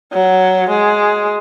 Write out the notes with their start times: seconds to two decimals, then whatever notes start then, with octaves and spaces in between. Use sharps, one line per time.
0.13 F#3
0.70 G#3